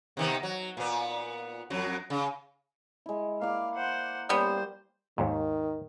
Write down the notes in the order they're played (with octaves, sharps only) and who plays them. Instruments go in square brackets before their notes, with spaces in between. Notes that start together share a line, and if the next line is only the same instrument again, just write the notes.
[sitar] C3 D#3 B3
F#3
A#2 B3
F2 F#3
C#3
[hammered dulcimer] G#3 E4
[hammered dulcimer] A#3 E4 D5 [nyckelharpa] F5
[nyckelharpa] C5 F#5
[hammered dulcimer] G3 [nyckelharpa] A#3 C5 [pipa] B3 C#4
[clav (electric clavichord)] D#2 G#2 [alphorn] D#3